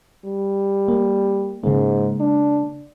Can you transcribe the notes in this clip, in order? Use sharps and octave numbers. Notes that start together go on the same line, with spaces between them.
G3
A#3
G#2 C#3 G#3 A#3
D4